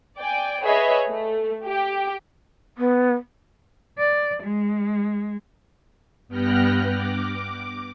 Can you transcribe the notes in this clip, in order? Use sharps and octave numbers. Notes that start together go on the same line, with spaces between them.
D5 G5 G#5
G#4 B4 C#5 D#5 E5
A3
G4 G5
B3
D5
G#3
G2 B3 G5 F6 F#6 A#6
D6